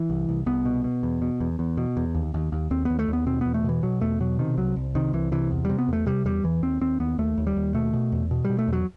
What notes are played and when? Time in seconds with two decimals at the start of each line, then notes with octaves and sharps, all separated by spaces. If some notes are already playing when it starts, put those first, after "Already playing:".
Already playing: E3
0.10 C2
0.29 C2
0.46 C2 B3
0.65 B2
0.84 B2
1.03 E2
1.22 B2
1.40 E2
1.59 E2
1.77 B2
1.97 E2
2.15 D#2
2.34 D#2
2.52 D#2
2.71 D#2 C4
2.85 D#2 B3
2.99 A3
3.08 D#2
3.13 B3
3.26 B2 C4
3.41 E2 B3
3.54 A3
3.64 B2 E3
3.83 B2 F#3
4.01 E2 A3
4.20 B2 F#3
4.39 C3 D#3
4.57 C2 F#3
4.76 C2
4.95 C3 D#3
5.13 C2 E3
5.32 C3 E3
5.51 E2
5.65 C3 G3
5.78 B3
5.88 E2 A3
6.06 C3 G3
6.25 E2 G3
6.43 E2 E3
6.62 D#2 C4
6.81 D#2 C4
7.00 D#2 B3
7.18 D#2 A3
7.38 D#2
7.47 G3
7.56 D#2
7.74 B2 A3
7.93 B2
8.12 E2
8.31 B2
8.45 G3
8.50 B2
8.59 A3
8.68 E2 F#3